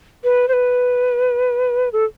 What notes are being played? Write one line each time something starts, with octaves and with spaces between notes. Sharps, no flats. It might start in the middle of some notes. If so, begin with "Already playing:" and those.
B4
C5
B4
A4